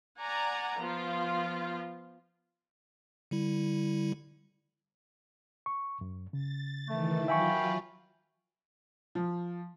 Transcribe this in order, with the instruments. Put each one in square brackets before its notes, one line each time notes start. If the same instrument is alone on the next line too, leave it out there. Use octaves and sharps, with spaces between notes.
[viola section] D5 F#5 G#5 A#5
F3 B3 F4
[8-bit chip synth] D3 G3 E4
[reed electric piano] C#6
F#2
[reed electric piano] C#3 [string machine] A6
[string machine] D#3 E3 [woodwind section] A3
[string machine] F#3 F4 [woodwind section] A#3 G5 B5 [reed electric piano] E5 G#5 C#6
[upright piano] F3